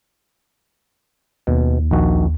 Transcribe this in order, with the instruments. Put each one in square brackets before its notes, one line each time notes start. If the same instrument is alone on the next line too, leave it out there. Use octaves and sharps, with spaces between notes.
[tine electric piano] D#2 [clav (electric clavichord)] B2
[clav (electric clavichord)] A#1 D#3 F#4